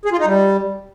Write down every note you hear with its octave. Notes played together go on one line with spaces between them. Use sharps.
G#4
F4
D#4
G3